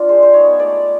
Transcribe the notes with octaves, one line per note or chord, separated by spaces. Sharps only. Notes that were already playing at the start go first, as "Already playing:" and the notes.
Already playing: F3 D4 F4 D5
G#3 C5
C5
B3 D#4 C#5
A3 D5